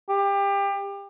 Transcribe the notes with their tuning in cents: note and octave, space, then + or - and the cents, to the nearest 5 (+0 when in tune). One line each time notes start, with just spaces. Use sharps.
G4 +25